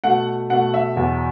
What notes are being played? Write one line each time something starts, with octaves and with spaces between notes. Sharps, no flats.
B2 A3 F#5
B2 A3 F#5
E5
E2 B2 F#3